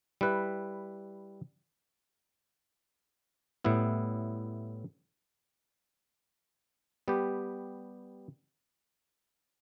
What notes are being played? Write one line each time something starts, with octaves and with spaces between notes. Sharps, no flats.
G3 E4 B4
A2 G3 B3 E4
G3 B3 G4